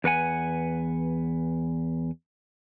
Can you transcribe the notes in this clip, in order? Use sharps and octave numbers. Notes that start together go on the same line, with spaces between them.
E2 B4 F#5 G#5